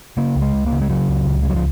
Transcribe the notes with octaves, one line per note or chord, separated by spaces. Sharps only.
C#3 A#3
C#2
G#3
C#2
A#3
C#3
G#3
C#3 F#3
C#2
C#2
G#3
C#3 F#3
F3